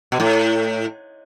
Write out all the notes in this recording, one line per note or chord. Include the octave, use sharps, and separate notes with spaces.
B2
A2